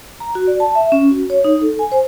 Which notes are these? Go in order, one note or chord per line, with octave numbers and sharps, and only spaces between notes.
A#5
F#4
D5
A5
E5
C#4
F#4
C#5
D#4
A4
G#5
C5